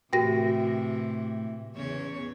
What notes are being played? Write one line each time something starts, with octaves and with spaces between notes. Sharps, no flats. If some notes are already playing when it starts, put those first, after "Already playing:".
A2 C3 E3 F#4 G4 A#4 G5 A#6
E2 C#3 C#5